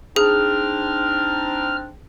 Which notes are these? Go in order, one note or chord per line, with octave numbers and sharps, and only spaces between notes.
C4 D4 D#4 G#4 F6